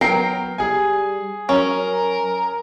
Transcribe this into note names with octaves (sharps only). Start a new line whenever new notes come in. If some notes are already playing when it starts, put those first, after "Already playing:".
F#3 B3 A#4 G5 C7
G3 G#4 G#5
F#3 C#4 A#4